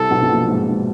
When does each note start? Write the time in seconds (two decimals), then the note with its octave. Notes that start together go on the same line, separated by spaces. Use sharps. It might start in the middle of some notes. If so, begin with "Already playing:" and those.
Already playing: C2 C3 A4
0.11 B1 B2
0.23 B2
0.29 A#1 A#2
0.48 G#2
0.68 G#2